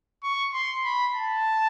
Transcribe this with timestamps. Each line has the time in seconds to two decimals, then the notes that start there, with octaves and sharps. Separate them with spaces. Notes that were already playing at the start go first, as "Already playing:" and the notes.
0.23 C#6
0.53 C6
0.84 B5
1.15 A5